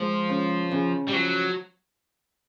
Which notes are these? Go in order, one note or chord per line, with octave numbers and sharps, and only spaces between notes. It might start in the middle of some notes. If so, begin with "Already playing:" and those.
Already playing: F3 G#3
C#3
C#3
G3
F3 F#3